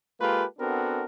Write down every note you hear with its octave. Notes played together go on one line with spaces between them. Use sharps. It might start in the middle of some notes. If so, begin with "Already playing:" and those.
G#3 A#3 F4 G4 A4 B4
B3 C4 D4 F#4 A4 A#4